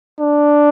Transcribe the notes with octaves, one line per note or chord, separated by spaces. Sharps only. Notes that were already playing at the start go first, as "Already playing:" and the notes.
D4